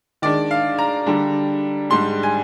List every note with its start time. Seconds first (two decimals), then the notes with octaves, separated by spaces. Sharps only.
0.22 D#3 G#3 D4 D5
0.51 F5
0.79 A#5
1.06 D3 G3 D4
1.90 G#2 G3 D4 C6
2.23 G#5